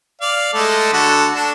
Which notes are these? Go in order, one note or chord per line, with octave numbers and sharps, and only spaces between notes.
D5 F5
G#3 A3 A4
D3 F#4 A4
D4 A4